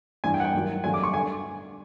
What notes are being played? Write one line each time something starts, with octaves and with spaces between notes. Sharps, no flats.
G2 E3 G#5
G5
F#5
G5
G2 D#3 F#3
G2 D3 F#3 G#5
D6
C#6
D3 G#5